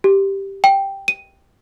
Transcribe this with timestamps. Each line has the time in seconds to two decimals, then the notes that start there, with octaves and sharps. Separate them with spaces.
0.04 G4
0.64 G5
1.08 D#7